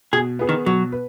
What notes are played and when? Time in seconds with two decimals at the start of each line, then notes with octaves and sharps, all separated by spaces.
0.13 B2 G#4
0.39 B3 G#4 B4
0.49 D#3
0.66 B2 F#3
0.92 B4